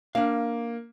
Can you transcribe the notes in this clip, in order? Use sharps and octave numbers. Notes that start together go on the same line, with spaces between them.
A#3 D4 F5